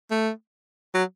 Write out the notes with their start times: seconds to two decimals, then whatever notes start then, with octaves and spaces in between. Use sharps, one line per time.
0.10 A3
0.94 F#3